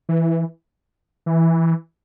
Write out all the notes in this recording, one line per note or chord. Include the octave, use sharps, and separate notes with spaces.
E3
E3